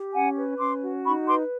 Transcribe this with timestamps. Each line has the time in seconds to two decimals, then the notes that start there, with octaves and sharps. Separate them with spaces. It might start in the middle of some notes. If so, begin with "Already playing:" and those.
Already playing: G4
0.13 C#4 F#5 G#5
0.36 B4
0.59 C#4 C6 D6
0.83 F#4
1.05 D#4 B5 C#6
1.28 B4 C6 D6